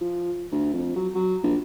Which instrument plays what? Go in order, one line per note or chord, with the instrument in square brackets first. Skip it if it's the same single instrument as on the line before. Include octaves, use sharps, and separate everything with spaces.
[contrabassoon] F3
D2
F2
F#3
F#3
A#1